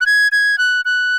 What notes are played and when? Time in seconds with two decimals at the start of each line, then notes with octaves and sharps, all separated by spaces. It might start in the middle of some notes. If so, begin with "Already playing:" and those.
0.01 F#6
0.06 G#6
0.32 G#6
0.58 F#6
0.85 F#6